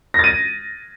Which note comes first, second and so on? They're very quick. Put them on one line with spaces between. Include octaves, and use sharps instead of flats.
A#6 A6 D#7